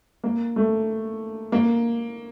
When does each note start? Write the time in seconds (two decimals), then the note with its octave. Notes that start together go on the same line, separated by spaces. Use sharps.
0.24 A#3
0.56 A3
1.52 A#3